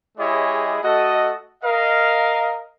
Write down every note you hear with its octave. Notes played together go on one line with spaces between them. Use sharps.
G#3 E4 G4 G#4 C#5 D#5
A3 F#4 A4 D#5
A#4 D#5 F5